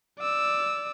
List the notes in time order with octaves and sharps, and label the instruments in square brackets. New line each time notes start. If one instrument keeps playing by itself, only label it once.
[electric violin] D5 E6